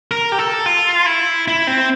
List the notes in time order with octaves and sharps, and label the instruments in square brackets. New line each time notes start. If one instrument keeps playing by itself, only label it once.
[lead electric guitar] A#4
G4
A4
F4
E4
E4
C4